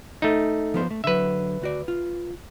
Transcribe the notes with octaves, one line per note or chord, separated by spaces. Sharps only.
A3 D#4
F3 B3 C5
A3
D3 F#3 B4 E5
D2 F#4 D5
F4